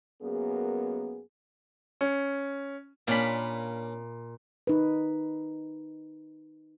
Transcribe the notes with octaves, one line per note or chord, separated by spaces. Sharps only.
F#2 A#3 B3 G#4
C#4
A#2 A#3 C#4 D4 B5
D#4 B4